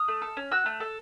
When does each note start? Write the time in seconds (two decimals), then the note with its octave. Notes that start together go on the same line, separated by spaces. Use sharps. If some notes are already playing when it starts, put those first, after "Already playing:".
Already playing: D#6 F6
0.08 A3
0.22 A4
0.37 C#4
0.52 F#4 E6 F#6
0.66 A3
0.80 A4